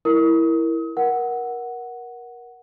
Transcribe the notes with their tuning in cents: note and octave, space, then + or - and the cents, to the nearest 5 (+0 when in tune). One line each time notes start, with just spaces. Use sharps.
E4 +0 A#4 +0 D#6 +35
A#4 +25 F#5 +0